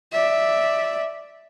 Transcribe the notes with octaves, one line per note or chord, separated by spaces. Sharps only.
D5 E5